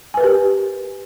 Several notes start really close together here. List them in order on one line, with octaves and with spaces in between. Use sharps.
G#5 B4 A#4 G4